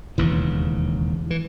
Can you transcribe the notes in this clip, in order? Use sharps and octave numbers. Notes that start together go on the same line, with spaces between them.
E1 D#2 C#3 E3
E3